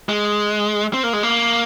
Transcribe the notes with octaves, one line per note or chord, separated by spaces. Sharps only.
G#3
C4
A#3
G#3
A#3